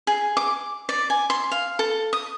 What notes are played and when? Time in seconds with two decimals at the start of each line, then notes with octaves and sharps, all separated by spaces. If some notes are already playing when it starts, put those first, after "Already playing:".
0.07 G#4
0.37 D6
0.89 D5
1.10 G#5
1.30 C6
1.52 F5
1.79 A4
2.13 D#6